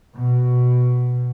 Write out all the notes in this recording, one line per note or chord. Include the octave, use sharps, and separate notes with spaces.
B2